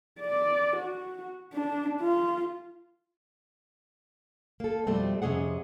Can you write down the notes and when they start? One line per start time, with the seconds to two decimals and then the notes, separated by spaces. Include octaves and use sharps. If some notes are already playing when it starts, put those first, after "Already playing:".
0.20 D5
0.76 F#4
1.53 D4
2.02 F4
4.60 A#3 A4
4.87 F2 B2 G3 A3 C4
5.22 F2 C3 C#4 G#4 F#5